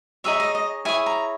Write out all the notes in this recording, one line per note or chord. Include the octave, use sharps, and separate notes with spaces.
D#4 G#4 C#5 E5
D#5
D#5
E4 G#4 C#5 G#5
A#5